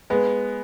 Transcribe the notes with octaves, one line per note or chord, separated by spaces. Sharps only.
G#3 B3